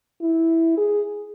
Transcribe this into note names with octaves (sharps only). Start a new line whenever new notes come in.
E4
G#4